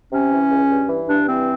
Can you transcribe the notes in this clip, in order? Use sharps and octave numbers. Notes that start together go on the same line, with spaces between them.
C3 C#4
E3
C#2
G2
E3
G2 D4
E3 C4